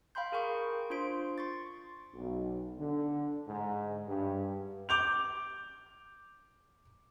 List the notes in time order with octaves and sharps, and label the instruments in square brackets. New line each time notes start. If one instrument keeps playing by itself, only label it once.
[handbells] F5 G5 B5 C6 G6
G#4 A#4 G5 C#6
D4 F4 C5 C6 D7
C6 C#6 A6
[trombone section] B1
D3
G#2
G2
[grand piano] D6 G6 F7